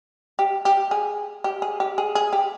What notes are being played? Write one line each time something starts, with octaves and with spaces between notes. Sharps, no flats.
G4
G4
G#4
G4
G#4
G4
G#4
G#4
G4